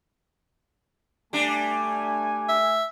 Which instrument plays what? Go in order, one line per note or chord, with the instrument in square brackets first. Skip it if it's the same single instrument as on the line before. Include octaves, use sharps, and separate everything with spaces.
[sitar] G3 D4 [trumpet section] A3 G#5
[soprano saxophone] E5